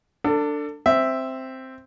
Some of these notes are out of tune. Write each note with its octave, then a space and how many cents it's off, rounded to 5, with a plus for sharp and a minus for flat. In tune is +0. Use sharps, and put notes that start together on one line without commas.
D4 +0 A4 +30
C4 +0 E5 +0